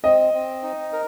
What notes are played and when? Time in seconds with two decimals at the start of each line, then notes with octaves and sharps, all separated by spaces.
0.04 C4 D#5
0.34 C4
0.63 D#4
0.92 A#4